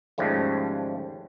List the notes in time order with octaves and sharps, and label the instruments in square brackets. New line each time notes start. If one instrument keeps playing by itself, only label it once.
[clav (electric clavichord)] D#2 G#2 C#3 F3 G3 A3